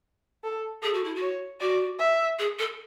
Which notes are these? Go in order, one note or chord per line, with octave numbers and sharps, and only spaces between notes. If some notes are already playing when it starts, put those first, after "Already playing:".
A4
G#4 A4
F#4
E4
F#4
C#5
F#4 D5
E5
G#4
A4